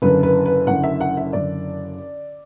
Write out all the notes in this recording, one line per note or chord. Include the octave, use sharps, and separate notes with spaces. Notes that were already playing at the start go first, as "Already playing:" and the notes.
F#1 F#2 D3 B4
B4
B4
F#1 F#2 D3 F#5
E5
F#5
E5
F#1 F#2 D3 D5